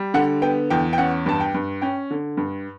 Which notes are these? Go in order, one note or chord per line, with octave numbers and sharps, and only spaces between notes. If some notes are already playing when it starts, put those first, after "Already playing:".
Already playing: G3
D3 F#5
B3 G5
E2 G5
G5
C#4 F#5
G2 A5
G5
G2
C#4 G5
D3
G2